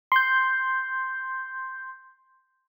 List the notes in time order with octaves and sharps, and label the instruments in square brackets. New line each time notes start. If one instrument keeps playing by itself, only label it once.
[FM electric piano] C6 G6